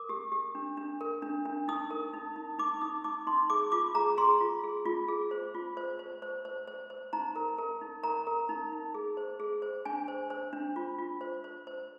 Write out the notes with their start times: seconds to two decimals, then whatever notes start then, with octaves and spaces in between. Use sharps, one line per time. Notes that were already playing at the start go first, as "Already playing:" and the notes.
Already playing: A#4 D6
0.09 G4
0.32 G4
0.55 D4
0.77 D4
1.01 A#4
1.22 D4
1.45 D4
1.68 D#4 D#6
1.91 A#4
2.13 D#4
2.36 D#4
2.59 D#4 D6
2.81 D#4 D#6
3.04 D#4 D6
3.27 D#4 C6
3.50 G#4 D6
3.72 F4 D6
3.95 G#4 A#5
4.18 G#4 C6
4.41 F4
4.64 G#4
4.86 F4
5.08 G#4
5.31 C5
5.54 F4
5.77 C5
5.99 C5
6.22 C5
6.45 C5
6.68 C5
6.90 C5
7.13 D#4 A#5
7.36 A#4
7.58 A#4
7.81 D#4
8.03 A#4 A#5
8.27 A#4
8.49 D#4
8.72 D#4
8.94 G#4
9.17 C5
9.40 G#4
9.62 C5
9.85 D4 G#5
10.08 C5
10.30 C5
10.53 D4
10.76 F4
10.98 F4
11.21 C5
11.44 C5
11.67 C5